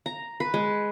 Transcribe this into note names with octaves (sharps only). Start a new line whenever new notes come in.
A#5
B4
G#3